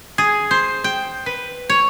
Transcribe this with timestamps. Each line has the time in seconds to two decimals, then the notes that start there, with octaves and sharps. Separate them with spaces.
0.18 G#4
0.51 C5
0.84 G5
1.26 B4
1.70 C#5